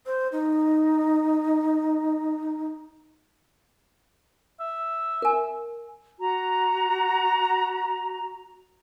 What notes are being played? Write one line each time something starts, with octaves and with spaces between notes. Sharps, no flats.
C5
D#4
E5
A#4 G#5
F#4 A#5